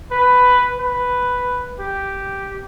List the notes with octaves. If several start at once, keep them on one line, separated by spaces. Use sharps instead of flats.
B4
B4
G4